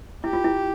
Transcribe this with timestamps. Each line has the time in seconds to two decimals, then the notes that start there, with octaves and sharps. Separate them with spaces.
0.24 E4 G4
0.33 F4
0.44 E4